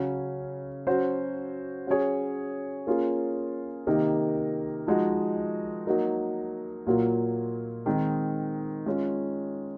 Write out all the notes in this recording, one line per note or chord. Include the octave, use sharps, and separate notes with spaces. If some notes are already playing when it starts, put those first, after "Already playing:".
Already playing: C#3 F#3 C#4
F#3 C#4 F#4 C5
F#3 C#4 G#4 C#5
A#3 C#4 F4 G#4
C3 D#3 A#3 D#4 A#4
F3 G#3 D#4 F#4
F#3 A#3 D#4 A#4
A#2 F#3 A#3 F4
D#3 G#3 C4 D#4
G#3 C#4 F4